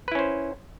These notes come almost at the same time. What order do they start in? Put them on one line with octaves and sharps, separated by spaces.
B4 E4 C#4 C5